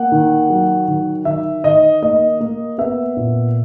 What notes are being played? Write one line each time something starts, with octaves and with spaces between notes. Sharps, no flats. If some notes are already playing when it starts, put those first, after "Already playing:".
Already playing: A#3 F#5
D#3
F#3
D#3
D#3 E5
D#3 D#5
A#3 D#5
A#3
B3 E5
A#2